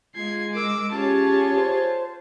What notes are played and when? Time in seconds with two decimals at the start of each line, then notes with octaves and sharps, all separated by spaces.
0.16 G#3 F4 G#6 C7
0.54 A#4 D6 E6
0.92 C#4 F4 G4 G#4 C#5 A5
1.56 C5